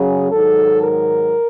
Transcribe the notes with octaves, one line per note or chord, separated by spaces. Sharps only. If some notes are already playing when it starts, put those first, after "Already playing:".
Already playing: F#2 C#3 F#3 G#4
G#2 D#3 F#3 A4
A#4